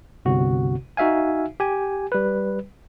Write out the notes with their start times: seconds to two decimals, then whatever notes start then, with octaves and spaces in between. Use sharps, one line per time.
0.25 G1 C2 C3 F#4
0.97 D#4 F#4 E5 F5 G#5
1.60 G4 G#5
2.12 G3 B4